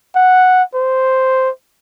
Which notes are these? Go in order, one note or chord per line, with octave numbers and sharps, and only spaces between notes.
F#5
C5